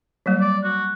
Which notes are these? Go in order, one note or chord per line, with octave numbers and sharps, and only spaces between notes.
F#3 G3 A#3
D5
F#4